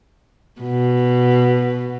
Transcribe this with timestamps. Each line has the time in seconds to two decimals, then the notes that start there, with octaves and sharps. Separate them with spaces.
0.61 B2